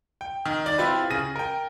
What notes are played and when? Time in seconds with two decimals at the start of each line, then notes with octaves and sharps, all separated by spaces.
0.21 G5
0.46 D#3
0.66 D5 A6
0.78 C4 E4 F4 G4 B4
1.10 C#3 G#4 A#6 D#7
1.35 A#4 G5